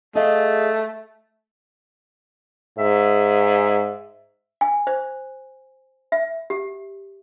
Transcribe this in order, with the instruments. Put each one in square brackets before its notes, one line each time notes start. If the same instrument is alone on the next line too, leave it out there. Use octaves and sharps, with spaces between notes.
[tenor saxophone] A3 [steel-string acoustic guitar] G#4 D#5 F5
[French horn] G#2 [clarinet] E5
[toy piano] G#5
C5
E5
G4